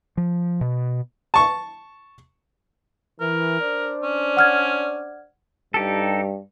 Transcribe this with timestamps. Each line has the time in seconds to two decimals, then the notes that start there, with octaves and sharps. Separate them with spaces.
0.17 F3
0.61 B2
1.34 A5 C#6
3.20 E3 A#4
3.60 D4 C5 D5
4.03 C#4
4.37 F#5 F6 G#6
5.74 G2 D#4 G4 A4